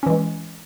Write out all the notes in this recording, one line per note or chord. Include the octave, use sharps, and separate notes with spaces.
E3 G#3 C#4